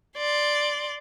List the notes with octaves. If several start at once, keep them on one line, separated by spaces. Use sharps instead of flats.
D5 C6